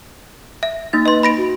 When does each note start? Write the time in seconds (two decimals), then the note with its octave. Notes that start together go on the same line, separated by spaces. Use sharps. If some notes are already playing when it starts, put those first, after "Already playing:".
0.63 E5
0.93 A#3 D#4 A6
1.06 B4 D#5 C6
1.23 B5 A#6 D7
1.37 F#4